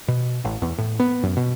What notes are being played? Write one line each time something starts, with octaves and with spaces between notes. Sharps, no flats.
B2
A1
E2
A2
B3
F#2
B2